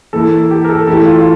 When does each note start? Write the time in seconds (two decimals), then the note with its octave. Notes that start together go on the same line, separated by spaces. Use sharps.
0.13 E3 A#3 E4 A4
0.51 G4
0.64 A#4
0.69 A4
0.87 E3 A3 E4 G4 A4
1.06 F4
1.20 F4